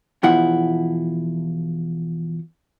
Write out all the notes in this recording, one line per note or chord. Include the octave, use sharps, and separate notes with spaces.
E2 B2 F3 E4 F#5